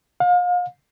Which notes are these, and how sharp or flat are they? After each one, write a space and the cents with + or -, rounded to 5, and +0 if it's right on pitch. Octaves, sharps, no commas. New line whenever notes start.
F5 +35